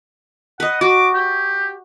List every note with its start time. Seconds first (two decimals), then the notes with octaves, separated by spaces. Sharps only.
0.60 B4 D#5 F#5
0.81 F#4 D6
1.14 G4